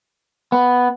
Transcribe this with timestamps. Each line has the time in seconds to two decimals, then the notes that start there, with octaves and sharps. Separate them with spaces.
0.52 B3